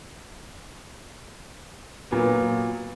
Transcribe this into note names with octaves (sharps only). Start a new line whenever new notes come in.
A#2 F#3 B3